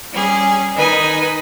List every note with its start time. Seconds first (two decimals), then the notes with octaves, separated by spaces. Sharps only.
0.13 G3 C#4 G#4
0.75 D#3 D#4 B4 G#5 B5